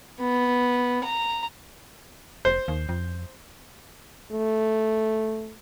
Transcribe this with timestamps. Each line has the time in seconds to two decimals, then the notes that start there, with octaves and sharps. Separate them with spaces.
0.20 B3
1.04 A#5
2.45 F1 C5
2.68 D#2
2.89 F2
4.32 A3